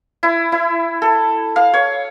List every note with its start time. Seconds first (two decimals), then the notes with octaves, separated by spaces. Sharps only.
0.23 E4
0.52 E4
1.02 A4
1.56 F5
1.73 C#5